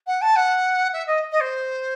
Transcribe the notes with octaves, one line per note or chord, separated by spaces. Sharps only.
F#5
A5
F#5
E5
D#5
D#5
C5